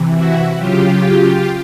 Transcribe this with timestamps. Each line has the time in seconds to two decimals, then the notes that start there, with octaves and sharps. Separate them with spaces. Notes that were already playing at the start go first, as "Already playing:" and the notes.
Already playing: C3 E3
0.14 E4 F#4
0.57 C#3 F#3 F4 G4